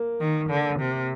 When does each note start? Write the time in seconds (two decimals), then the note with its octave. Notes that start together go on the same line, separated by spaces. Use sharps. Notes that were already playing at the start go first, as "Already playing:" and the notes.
Already playing: A#3
0.20 D#3
0.50 D3
0.79 C3